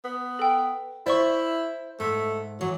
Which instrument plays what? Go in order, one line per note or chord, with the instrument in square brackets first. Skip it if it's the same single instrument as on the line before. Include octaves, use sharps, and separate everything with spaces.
[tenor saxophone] B3
[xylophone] A4 G5
[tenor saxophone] E4 [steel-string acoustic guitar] C5 E5 [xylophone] D5 C#6
[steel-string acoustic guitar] G#2 [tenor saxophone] A3
[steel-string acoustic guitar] E3 [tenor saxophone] F#3